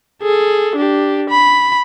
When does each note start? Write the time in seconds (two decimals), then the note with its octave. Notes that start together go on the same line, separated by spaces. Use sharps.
0.23 G#4 A4
0.76 D4 G4
1.30 B5